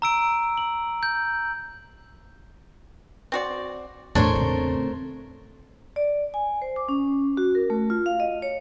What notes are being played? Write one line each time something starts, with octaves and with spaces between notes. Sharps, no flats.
A#5 E6 D7
F#7
G6
C4 F#4 D5
E2 A2 A3 D4 A#4 C5 C#5
C#3 C4
D5
G#5
C5
D6
C#4
F#4
A#4
A3
F4
F5
D#5
C#5